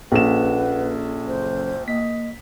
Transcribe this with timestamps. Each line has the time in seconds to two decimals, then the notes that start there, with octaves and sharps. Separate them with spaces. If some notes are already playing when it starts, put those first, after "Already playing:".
0.12 A#1 A#3 C#4 A4 B4 F#5 E7
1.28 F#1 C5
1.88 A#3 D#5 B6